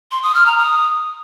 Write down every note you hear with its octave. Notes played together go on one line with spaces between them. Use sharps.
C6
D#6
F6
A#5
D#6